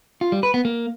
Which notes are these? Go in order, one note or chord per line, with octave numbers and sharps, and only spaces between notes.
F4
G3
B4
B3
A#3